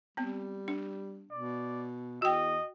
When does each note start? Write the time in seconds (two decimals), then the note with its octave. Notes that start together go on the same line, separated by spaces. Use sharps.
0.17 G3 B3 C4
0.68 D4
1.31 B2 D5
2.22 E2 F#4 D#5 G5